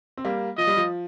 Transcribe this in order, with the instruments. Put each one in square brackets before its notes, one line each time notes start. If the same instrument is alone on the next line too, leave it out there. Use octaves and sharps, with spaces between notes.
[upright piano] C4
G3 A#3
[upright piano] F3 [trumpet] D#5
[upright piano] G3
F3